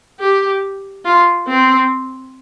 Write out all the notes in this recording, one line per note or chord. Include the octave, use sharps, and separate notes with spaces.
G4
F4
C4